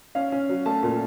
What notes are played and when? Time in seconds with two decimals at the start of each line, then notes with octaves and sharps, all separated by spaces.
0.15 C#4 F5
0.32 C#4
0.49 F#3
0.66 A3 A5
0.83 A#2